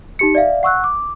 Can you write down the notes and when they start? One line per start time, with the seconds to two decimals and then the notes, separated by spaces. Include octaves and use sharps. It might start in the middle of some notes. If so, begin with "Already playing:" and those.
0.19 D#4 G4 C#7
0.35 D5 E5 F5
0.63 F#5 C#6 E6 F#6
0.84 D6